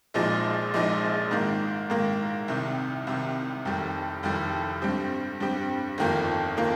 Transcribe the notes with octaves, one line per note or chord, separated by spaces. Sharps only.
A#1 A#2 F3 G#3 D#4
A#1 A#2 F3 G#3 D#4
G#2 D#3 A#3
G#2 D#3 A#3
C2 C3 D#3
C2 C3 D#3
F1 F2 D#3 G3
F1 F2 D#3 G3
G2 G3 C4 G4
G2 G3 C4 G4
G1 F2 D#3 A#3 F4
D#3 A#3 F4